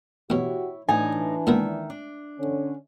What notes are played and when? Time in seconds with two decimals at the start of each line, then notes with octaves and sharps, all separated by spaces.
0.30 A1 B2 E4 F#4 G4 C#5
0.88 A2 E3 D4 D#4 G#5
1.47 C#2 A#2 D#3 B3 E5
1.90 D4
2.39 D3 C#4